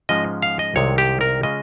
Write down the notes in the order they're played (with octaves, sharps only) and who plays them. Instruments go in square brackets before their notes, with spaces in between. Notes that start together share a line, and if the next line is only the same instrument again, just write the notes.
[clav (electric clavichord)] G#2 F3 G#3 C#4 F4 D#5
F5
D#5
C2 C3 D#3 G#3 C4 C#5
G4
A#4
C#3 G#3 C#4 F4 D#5